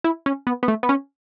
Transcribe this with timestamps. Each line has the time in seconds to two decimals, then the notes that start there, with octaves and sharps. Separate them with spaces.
0.04 E4
0.26 C#4
0.47 B3
0.63 B3
0.68 A3
0.83 B3
0.89 C#4